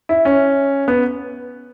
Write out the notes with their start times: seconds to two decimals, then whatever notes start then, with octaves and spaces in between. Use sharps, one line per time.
0.09 E4
0.25 C#4
0.88 B3